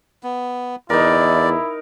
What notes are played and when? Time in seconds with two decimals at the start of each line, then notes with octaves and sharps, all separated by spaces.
0.23 B3
0.90 E2 D#4 E4 A#4 D5